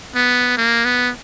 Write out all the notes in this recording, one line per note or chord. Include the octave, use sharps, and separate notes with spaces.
B3
A#3
B3